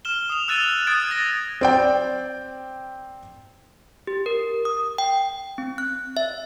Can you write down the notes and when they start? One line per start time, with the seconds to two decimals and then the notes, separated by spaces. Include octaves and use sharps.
0.05 F6 E7 G7
0.30 D#6 F7
0.48 E6 F#6 A6 D#7 F7 G7
0.87 D#6 F#6 G#6 A6 D7 F7
1.11 A6 A#6
1.61 C4 D5 G5
4.07 G4
4.26 A#4
4.65 D#6
4.98 G5
5.58 C4
5.78 F#6
6.17 E5